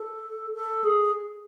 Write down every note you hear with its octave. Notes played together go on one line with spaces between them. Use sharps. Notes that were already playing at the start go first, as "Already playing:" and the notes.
Already playing: A4
A4
G#4